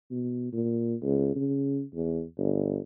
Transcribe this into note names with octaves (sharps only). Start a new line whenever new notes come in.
B2
A#2
C#2
C#3
E2
G1